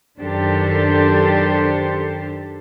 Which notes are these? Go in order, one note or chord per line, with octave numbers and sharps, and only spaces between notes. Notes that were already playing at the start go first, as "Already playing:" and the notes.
F#2 D#3 D4 G4 A4 C5